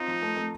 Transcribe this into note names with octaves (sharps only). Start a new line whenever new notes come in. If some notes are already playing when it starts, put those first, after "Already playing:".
Already playing: C4 D#4 F4
F3
A3
A3